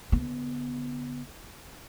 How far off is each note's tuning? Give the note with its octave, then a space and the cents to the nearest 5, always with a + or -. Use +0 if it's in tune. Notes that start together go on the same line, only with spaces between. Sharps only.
D3 -35 B3 +0